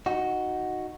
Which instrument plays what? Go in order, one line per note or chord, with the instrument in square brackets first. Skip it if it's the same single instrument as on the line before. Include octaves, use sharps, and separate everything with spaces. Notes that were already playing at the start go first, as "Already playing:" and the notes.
[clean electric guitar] D#4 F#4